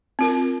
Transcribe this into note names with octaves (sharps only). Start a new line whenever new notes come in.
C4 F4 A#4